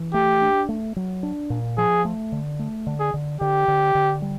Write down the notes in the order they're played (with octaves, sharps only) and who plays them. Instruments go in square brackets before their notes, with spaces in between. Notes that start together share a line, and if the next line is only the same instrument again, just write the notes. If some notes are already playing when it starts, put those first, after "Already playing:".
Already playing: [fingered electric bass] E3
[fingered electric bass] A3 [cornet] G4
[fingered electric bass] D4
A3
F#3
D4
A#2
[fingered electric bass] F3 [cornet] G#4
[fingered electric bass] A3
D3
A3
D3
[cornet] G#4
[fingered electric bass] D3
[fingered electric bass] D3 [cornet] G4
[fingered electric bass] D3
D3
G3